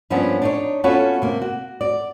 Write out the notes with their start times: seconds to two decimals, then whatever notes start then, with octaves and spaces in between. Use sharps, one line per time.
0.10 G2 F3 A#3 B3 C#4 D4
0.42 D4 D#4 C#5
0.84 B3 C#4 F4 F#4 A4 C#5
1.22 C3 A#3
1.42 F#4
1.81 D5